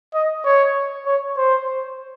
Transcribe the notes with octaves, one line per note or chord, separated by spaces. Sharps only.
D#5
C#5
C#5
C5